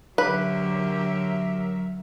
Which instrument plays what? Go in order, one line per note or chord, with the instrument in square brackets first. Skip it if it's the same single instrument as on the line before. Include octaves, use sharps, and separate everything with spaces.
[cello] D3 G4 [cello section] F#3 A#4 E5 [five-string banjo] B4